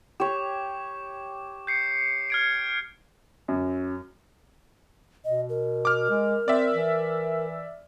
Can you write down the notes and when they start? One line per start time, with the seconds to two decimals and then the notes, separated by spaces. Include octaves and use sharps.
0.20 G4 C#5 D6
1.67 G6 C7 C#7
2.30 F6 G#6 D7
3.48 F#2
5.25 B2 D#5
5.49 A#4
5.85 D6 F6
6.10 G#3
6.48 C4 D5 E5
6.74 E3